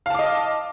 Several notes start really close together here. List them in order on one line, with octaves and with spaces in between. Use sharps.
F5 A5 D6 D#5